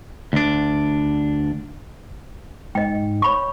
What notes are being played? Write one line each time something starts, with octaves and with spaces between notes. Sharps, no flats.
D2 D4
G#2 D#5 G5
C#5 B5 C#6